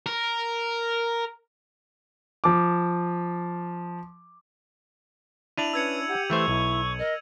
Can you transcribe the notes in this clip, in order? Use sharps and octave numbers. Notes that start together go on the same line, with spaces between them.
A#4
F3 D6
D4 E4 D#7 F7 F#7
C#4 B4 E6 G#6 C#7
G4 F#5
E3 A3 C5 C#6
B1 E4
A#4 D#5